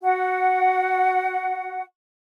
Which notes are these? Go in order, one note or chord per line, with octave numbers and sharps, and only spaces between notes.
F#4 F#5